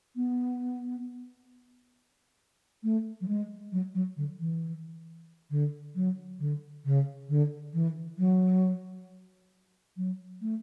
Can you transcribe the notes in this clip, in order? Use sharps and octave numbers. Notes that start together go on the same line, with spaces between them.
B3
A3
F#3
G#3
F#3
F#3
D3
E3
D3
F#3
D3
C#3
D3
E3
F#3
F#3
A3